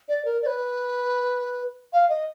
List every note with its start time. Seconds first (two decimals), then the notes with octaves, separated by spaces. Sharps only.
0.08 D5
0.25 A#4
0.42 D5
0.46 B4
1.93 F5
2.09 D#5